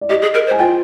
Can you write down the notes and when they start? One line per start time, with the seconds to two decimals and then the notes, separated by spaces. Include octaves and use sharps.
0.01 D5
0.09 G4 D#5
0.22 G#4
0.34 A#4
0.47 C5
0.51 G#5
0.59 F4 G5